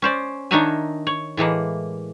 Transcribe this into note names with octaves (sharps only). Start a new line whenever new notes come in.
C#4 C5 D5
D#3 D4 D#4 C#5 E5 G#5
C#5
A2 E3 G#3 A#3